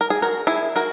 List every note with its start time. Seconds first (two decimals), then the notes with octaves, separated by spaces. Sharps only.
0.01 A#4
0.10 G#4
0.22 F#4 A#4
0.47 E4 G#4
0.76 F#4 A#4